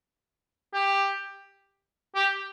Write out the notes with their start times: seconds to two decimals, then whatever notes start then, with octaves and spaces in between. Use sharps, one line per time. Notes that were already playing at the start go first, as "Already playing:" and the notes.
0.74 G4
2.16 G4